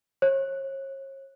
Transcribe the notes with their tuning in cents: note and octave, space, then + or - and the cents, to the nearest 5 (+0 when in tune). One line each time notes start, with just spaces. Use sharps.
C#5 -40